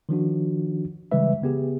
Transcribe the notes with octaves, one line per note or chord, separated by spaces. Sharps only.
D#3 F3 D4 F#4
C#3 E3 G3 G#3 B4 E5
C#3 B3 G4 G#4